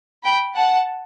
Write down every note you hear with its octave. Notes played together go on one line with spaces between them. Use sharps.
G5 B5
F#5 A5